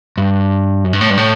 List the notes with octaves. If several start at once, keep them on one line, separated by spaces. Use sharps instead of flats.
G2
F#2
G2
A2
G2
A2